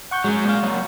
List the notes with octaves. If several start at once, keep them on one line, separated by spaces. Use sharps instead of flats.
F#5 C#6 G6
F#3 G#3 C#4
A#2 F5
F#3 A#3